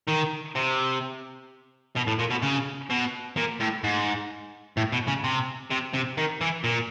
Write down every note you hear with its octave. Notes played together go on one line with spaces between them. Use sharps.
D#3
C3
B2
A2
A#2
B2
C#3
B2
A#2
A2
G#2
A2
B2
C#3
C3
C3
C3
D#3
E3
A#2